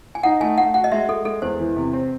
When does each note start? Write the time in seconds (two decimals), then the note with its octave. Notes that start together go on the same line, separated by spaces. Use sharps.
0.15 G#5
0.23 D#4 F#5
0.40 A3 G#5
0.58 A3 F#5
0.74 F#4 F#5
0.84 D#5
0.92 G#3 E5
1.09 G#3 A4
1.25 G#3 A4
1.42 E2 C5
1.59 E3
1.76 C3
1.93 C4